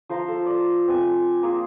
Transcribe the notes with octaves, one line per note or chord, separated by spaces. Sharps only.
F3 C5 F5 A#5
A4
D5
C4 G#5
A#3 F4 G#4